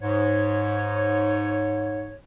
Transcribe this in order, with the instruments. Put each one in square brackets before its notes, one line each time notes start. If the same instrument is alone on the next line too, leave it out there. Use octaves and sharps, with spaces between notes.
[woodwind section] G#2 C#5